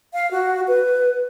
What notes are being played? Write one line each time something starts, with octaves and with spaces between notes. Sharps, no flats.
F5
F#4
B4